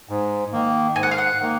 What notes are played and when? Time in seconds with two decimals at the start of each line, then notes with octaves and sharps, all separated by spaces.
0.09 G#2
0.53 D#3 A#3
0.96 G#2 G#5
1.03 F#5
1.11 F5
1.18 F#5
1.40 D#3 A#3